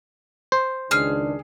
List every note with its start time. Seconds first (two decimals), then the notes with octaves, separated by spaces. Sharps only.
0.52 C5
0.91 C#2 D#3 D4 G#4 F6